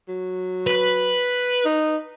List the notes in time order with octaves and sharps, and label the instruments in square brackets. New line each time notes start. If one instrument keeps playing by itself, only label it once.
[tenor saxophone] F#3
[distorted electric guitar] B4
[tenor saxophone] D#4